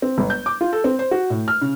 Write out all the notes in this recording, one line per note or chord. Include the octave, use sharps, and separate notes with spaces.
C4
G1
G6
D6
F4
A4
C4
C5
F#4
A2
F6
C#3